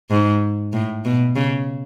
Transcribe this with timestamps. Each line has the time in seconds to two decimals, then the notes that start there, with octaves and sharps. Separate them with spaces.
0.10 G#2
0.73 A2
1.05 B2
1.36 C#3